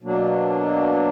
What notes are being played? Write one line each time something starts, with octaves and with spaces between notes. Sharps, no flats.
B2 F#3 A#3 D4